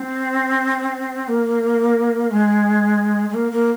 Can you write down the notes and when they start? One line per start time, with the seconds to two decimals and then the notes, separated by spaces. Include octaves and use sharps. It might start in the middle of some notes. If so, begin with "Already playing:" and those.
Already playing: C4
1.28 A#3
2.31 G#3
3.29 G#3
3.34 A#3
3.51 A#3